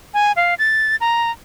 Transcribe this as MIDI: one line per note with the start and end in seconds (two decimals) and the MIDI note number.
0.14 0.32 80
0.36 0.54 77
0.59 0.96 93
1.01 1.31 82